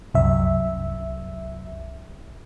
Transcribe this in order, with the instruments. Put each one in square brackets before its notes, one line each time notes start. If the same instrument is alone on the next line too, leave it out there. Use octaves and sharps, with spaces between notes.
[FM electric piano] C2 F#2 E5